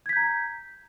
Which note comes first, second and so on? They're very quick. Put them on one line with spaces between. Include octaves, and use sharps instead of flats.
G#6 B6 G6 A#5